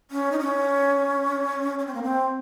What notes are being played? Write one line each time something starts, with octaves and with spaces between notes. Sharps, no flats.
C#4
D#4
C#4
C#4
C4
A#3
C4